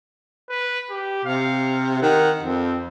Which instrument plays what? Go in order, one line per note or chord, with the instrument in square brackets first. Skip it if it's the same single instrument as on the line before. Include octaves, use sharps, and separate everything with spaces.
[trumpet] B4
G4
[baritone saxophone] C3 [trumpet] F5
[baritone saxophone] D#3 [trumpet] F#5
[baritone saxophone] F2 [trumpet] C4